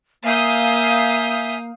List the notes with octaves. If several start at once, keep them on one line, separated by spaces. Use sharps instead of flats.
A#3 E5 F5 G#5 D#6 G6